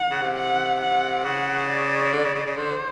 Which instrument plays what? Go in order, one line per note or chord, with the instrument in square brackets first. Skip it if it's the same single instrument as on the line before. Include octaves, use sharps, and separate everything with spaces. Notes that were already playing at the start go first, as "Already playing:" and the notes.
Already playing: [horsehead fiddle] F#5
[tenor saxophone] C#3
C3
[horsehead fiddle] F#5
F#5
[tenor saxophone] C#3 [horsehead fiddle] F#5
[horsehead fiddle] D5
[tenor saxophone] D3
C#3
C#3
C#3
[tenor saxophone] D3 [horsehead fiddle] C5